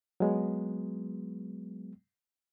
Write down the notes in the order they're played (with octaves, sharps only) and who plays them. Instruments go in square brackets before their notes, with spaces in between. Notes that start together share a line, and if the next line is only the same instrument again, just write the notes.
[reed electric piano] F#3 G#3 B3